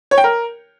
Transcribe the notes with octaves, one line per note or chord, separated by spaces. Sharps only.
C#5
G5
A#4